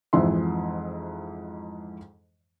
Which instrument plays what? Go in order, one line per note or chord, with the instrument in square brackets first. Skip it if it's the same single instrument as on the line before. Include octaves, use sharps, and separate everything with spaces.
[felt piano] F2 G#2 E3 E5 C6